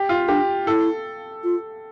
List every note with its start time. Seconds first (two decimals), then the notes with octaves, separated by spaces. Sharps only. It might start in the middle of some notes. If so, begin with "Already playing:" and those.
Already playing: G4
0.09 F4
0.28 D4 G4
0.66 E4 A4
1.44 F4